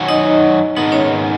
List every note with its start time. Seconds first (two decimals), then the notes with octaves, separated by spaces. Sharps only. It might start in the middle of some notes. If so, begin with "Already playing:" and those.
Already playing: F#2 D#3 F#3 C#4 F#4
0.08 D#4 D#5
0.76 G#2 D#3 G#3 B3 D#4 D#5
0.92 C#4 C#5